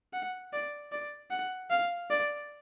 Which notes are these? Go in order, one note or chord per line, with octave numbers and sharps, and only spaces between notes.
F#5
D5
D5
F#5
F5
D5